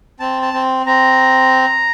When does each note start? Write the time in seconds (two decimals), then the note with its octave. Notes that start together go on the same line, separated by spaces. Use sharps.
0.20 C4 A5
0.42 A5
0.53 C4
0.86 C4 A#5